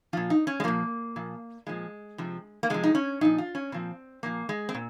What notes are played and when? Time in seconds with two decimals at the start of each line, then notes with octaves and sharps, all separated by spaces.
0.13 A#2 F3 F4
0.30 D#4
0.47 C#4
0.60 G#3
0.64 A#2 F3 A#3
1.16 A#2 F3
1.67 A#2 F3 G#3
2.18 C3 F3
2.63 A#3
2.70 C3 F3 G#3
2.84 D#4
2.95 C#4
3.21 A#2 F3 D#4
3.38 F4
3.55 C#4
3.72 A#2 F3 C4
4.23 A#2 F3 A#3
4.49 G#3
4.69 C4
4.75 A#2